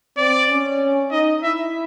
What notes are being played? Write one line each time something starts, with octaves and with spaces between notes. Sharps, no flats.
C4 D5
C#4
D#4 D#5
E4 E5